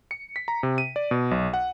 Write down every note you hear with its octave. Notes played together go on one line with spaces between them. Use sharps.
C#7
B6
A#5
C3
D#7
D5
B2
B1
F#5